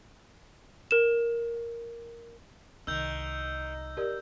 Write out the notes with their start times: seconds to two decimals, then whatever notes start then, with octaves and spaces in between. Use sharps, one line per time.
0.91 A#4 E7
2.87 C2 D#3 E6 G6
3.97 G4 A#4 D5